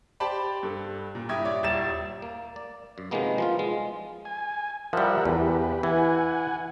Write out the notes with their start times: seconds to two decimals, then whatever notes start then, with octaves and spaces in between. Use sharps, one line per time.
0.20 G4 C5 D5 A5 B5
0.63 G2 A4
1.15 A#2
1.29 G2 E4 G4 D#6 G#6
1.45 E4 C#5 D5
1.63 D#1 E4 A6 E7
2.22 A#3
2.56 D5
2.98 F#2
3.11 C3 D#3 F3 G#3 A#3 B3
3.38 F3 B3 F4
3.59 G#3
4.25 G#5
4.93 F3 G3 A#4 E5 F#5
5.25 E2 G4 B4
5.83 E3 F#5 G#5